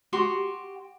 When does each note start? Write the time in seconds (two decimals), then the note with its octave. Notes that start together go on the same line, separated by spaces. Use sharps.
0.13 F#4 G4 C6